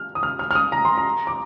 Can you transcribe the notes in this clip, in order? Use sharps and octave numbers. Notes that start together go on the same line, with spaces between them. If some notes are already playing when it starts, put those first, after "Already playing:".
Already playing: F6
D#6
F6
F6
F6
D#6
A#5
C6
A#5
D6